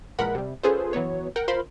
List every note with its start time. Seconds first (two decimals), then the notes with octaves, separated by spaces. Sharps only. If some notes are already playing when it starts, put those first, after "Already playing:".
0.19 A#1 E3 G#3 A#4 F#5 B5
0.35 C3 G3
0.63 C#4 F4 G#4 A4 B4 C5
0.93 E3 F#3 B3 C#5
1.36 A#4 F#5 G5
1.48 F4 A#4 C5 F5 B5 C6